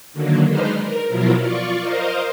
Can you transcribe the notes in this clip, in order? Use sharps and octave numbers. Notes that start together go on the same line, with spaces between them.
D3 D#3 F#3 A#3
G#3 D4 D#4 B4 C5 F6
A#4
B2 F3 F#3 E4 F4 A#4
F4 D5 C#6
A#4 C5 D#5 F5